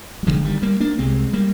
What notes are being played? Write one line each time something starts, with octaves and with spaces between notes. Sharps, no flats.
G3
G1 G2 D3 F3 G#3
D#3 G3
G3 A#3
A#3 D4
C2 C3 G#3 C4
G3 A#3